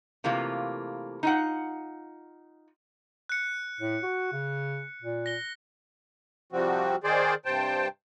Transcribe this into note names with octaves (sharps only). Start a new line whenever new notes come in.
C3 E3 A3 A#3 F4
D#4 F4 F#5
F#6 C#7
A2
F#4
C#3
A#2
A#6 G7
C3 F3 G3 C4 F#4
D#3 G#4 C5 D5
G2 C3 C5 G5 A5